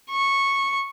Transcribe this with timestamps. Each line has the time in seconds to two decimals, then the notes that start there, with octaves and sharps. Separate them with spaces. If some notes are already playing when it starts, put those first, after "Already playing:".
0.11 C#6